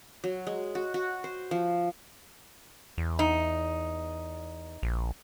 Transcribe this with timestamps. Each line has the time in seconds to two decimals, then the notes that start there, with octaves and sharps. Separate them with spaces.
0.24 F#3
0.47 G#3
0.75 F#4
0.94 F#4
1.24 C5
1.51 F3
2.98 E2
3.19 D#4
4.83 A#1